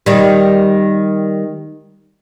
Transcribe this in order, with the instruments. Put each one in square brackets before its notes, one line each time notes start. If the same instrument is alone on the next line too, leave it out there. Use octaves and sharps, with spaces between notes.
[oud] D#3 G3